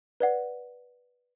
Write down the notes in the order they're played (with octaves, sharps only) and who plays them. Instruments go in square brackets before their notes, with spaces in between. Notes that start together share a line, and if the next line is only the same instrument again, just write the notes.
[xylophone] B4 D5 F#5